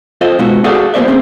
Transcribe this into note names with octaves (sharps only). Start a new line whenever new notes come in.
F4 A4 C5 D#5
B2 G#3 B3 E4 F#4
F#4 G#4 A4 D5 F5 F#5
A#3 B3 C5 D5 E5
C4 C#4 G#4 C5